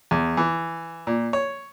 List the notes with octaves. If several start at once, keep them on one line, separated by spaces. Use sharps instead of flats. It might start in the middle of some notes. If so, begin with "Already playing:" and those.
E2
E3
A#2
C#5